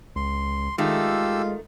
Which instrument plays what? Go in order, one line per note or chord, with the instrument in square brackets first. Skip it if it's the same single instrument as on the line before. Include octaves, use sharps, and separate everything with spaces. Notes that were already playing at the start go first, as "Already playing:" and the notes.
[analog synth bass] C#2 [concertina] C6
[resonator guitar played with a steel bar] D#3 A3 [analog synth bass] G#3 [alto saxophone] F4 [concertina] G4 A4 E6